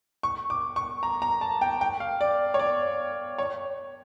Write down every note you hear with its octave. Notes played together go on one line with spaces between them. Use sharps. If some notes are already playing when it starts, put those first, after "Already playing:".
C#6
D6
C#6
A#5
A#5
A5
G5
G5
F5
D5
C#5
D5
C#5